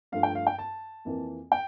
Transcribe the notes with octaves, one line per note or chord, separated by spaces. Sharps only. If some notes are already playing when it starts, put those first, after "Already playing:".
G2 F3 A3 F5
G5
F5
G5
A5
F2 E3 A#3
G5